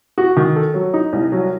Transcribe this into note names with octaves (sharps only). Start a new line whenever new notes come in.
F#4
D#3
A4
F#3
D#4
C2
F#3